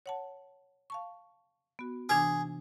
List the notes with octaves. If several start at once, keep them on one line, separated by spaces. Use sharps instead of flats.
C#5 F#5 A5
F5 A5 C#6
B3 F#4
C3 E3 D4 G#4